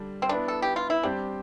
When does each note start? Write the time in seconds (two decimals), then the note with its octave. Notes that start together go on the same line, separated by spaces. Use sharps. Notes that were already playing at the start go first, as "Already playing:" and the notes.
Already playing: D3 G3 D4
0.22 C4
0.29 B3 D4 E4 B4 D5
0.48 A4
0.62 G4
0.76 F4
0.90 E4
1.03 G3 C4 D4 G4 C5